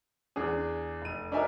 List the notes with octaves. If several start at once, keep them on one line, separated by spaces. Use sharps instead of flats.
E2 D4 G#4
F1 D#7
D4 D#4 F#4 A#4 E5 G#5